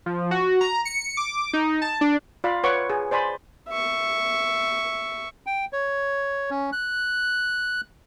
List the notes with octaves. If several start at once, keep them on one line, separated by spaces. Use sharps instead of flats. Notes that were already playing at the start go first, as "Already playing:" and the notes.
F3
F#4
A#5
C#7
D6
D#4
A5
D4
F4 D5 F5 B5
B4 C#5 F#5 C#6 D6
G#4
C5 D5 G#5 B5 C6
E5 C#6
G5
C#5
C#4
F#6